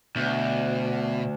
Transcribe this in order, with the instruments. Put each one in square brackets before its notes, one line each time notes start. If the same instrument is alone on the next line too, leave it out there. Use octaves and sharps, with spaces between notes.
[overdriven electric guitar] D2 [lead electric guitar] B2